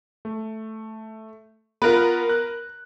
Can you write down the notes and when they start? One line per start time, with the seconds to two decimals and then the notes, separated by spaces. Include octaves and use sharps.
0.25 A3
1.82 B3 F4 A#4 B4
2.29 F#6